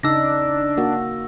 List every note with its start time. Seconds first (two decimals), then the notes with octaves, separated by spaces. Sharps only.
0.03 C#3 D4 D#4 E6 A#6
0.77 A#3 F#4